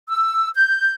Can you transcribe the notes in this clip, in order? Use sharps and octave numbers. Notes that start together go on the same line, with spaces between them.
E6
G6